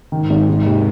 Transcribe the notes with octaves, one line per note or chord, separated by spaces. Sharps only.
G#2 D#3
G#1
C3 G#3
D#2